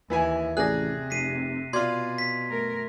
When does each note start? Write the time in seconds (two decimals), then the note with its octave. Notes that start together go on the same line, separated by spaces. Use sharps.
0.10 D#2 E3 E4 G#5
0.57 A1 C3 C4 G#4 D5 F#6 A#6
1.10 F1 B6 C7 D#7
1.73 B2 F4 D5 C6 G#6
2.18 B6
2.50 A3 A#4